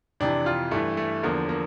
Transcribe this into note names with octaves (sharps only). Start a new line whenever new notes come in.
F2 C3 E3 D4
F4
G2 E3 A3
A3
E2 D3 F3 A#3
A#3